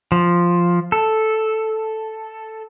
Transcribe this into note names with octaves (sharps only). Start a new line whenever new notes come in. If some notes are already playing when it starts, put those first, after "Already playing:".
F3
A4